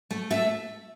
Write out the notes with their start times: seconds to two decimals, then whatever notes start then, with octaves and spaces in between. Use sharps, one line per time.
0.11 A3
0.31 A3 E5